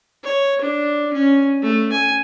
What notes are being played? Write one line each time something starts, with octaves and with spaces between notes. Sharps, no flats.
C#5
D4
C#4
A3
G#5